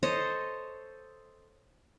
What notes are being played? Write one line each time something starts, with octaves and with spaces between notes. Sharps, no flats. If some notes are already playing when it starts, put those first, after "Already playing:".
A4 C5 C#5 D#5